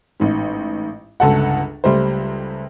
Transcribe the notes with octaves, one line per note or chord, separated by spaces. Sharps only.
A1 G#2
G1 C#2 A4 F#5
C#2 G3 A3 C5